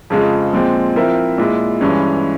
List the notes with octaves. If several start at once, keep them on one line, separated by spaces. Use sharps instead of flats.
F2 C#3 F3 G#3
A#2 F3 G#3 C4
F3 C4 E4 A#4 E5
A#2 G#3 E4
G2 E3 G#3 C#4